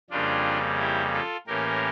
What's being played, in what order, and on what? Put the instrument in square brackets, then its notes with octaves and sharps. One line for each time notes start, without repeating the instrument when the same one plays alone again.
[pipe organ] F2 C#3 G3 A#3 D4 F4
E4 G4
F4 A4
A2 E3 A#3 C#4 G4 A#4